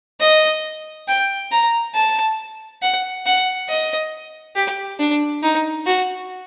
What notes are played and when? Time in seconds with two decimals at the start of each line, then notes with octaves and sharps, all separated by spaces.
0.21 D#5
1.08 G5
1.52 A#5
1.95 A5
2.82 F#5
3.26 F#5
3.69 D#5
4.55 G4
4.99 D4
5.43 D#4
5.86 F#4